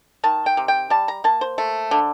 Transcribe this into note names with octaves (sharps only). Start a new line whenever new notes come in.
D#3 A5
G5
C3
G5
G3 A5
A#5
A#3 A5
C5
A3
D3